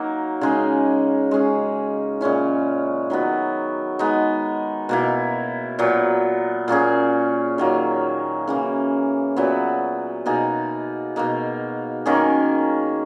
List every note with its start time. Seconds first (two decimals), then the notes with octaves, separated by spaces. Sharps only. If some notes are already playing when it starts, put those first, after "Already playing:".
Already playing: F#3 A#3 D#4
0.41 C#3 G#3 D#4 G#4
1.31 G#3 C#4 G#4
2.21 A#2 G#3 C#4 E4
3.10 D#3 F#3 B3
3.99 G#3 B3 D#4
4.89 B2 A#3 E4
5.79 A#2 F#3 B3
6.68 A#2 A#3 C#4 G#4
7.58 D#3 F#3 A#3
8.48 C#3 E3 A#3
9.36 A#2 F#3 B3 E4
10.26 B2 A#3 D#4 G#4
11.16 B2 A#3 D#4
12.06 D#3 A#3 C#4 G#4